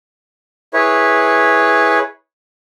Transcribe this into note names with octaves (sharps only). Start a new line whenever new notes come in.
E4 G#4 B4 C#5